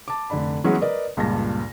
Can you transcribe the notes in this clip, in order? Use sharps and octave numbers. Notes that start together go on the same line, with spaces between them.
A5 D6
F1 D3 D4 D5 B5
E3 F#3 G#3 B3 C#4 F#4
A#4 B4 D5 D#5
C#2 G2 A#2 A5 A#6